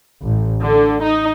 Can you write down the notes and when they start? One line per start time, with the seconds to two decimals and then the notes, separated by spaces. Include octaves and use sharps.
0.23 A1
0.62 D3
1.03 D#4